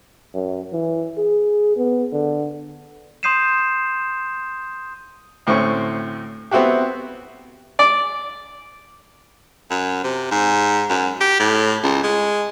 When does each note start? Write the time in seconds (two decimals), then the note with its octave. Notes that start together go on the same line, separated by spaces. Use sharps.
0.34 F#2
0.72 E3
1.18 G#4
1.77 B3
2.12 D3
3.23 C6 D#6 G6 C7 D#7 E7
5.47 D2 A2 C4 C#4 C#6
6.51 B3 C4 E4 F#4 G4
7.79 D5
9.70 F#2
10.04 C3
10.31 G#2
10.90 F#2
11.21 G4
11.39 A2
11.83 C#2
12.03 G#3